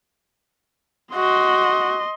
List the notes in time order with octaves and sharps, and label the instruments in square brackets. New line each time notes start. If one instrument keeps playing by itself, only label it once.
[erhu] F#4 [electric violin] D#5 C6